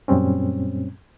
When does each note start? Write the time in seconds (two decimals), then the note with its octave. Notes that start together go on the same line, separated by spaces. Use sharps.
0.08 F#2 A#2 G3 C4 C#4